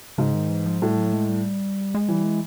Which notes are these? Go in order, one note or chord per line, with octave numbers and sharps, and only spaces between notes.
G#2 C#3
D#3
E3
F3
A2 G3
F#3
G#3
G3
G#3
E3 G3
G#3